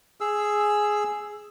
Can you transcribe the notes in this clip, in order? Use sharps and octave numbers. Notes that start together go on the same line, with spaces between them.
G#4 E6